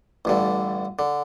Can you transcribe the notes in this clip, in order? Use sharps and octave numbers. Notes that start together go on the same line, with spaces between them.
A1 G2 D3
D3